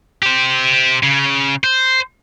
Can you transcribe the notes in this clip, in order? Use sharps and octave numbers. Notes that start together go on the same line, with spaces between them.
G4 C5
C#3
C5